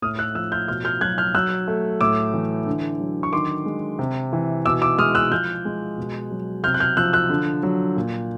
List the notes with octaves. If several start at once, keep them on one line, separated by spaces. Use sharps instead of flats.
A2 D#6 F6
E6 F#6
F3 E6 F#6
F6 G6
B2 F6 G6
F6 G6
F#3 F#6 G#6
F6 G6
F#3 E6 F#6
A3
A2 D6 E6
E3
D3
F#3
C#6
D#3 C6 D6
G#3
C3
E3
B2 D6 E6
D6 E6
G#3 D#6 F6
E6 F#6
F3 F6 G6
G#3
B2
F#3
C3 F6 G6
F#6
F6 G6
F3 E6 F#6
E6 F#6
D3
F#3
A#2